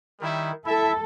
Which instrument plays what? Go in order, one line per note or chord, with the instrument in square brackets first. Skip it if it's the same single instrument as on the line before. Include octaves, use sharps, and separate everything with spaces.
[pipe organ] D#3 [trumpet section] G3 E4
[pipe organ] E4 [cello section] A4 [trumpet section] E5